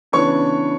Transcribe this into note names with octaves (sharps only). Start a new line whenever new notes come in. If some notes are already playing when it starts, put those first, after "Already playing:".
C#3 E3 B3 D4 C#5 C#6